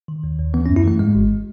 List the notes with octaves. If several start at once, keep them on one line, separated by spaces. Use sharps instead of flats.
D#3
D#2
D#2
E3 B3
C#4
F#2
E4
E3 A3
G#2 G#3
G#1